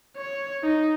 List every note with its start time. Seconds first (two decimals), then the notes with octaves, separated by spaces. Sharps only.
0.17 C#5
0.63 D#4